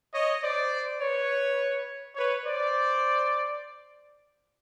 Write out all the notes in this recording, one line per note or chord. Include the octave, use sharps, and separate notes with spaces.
C#5 D#5
C5 D5
B4 C#5
B4 C#5
C5 D5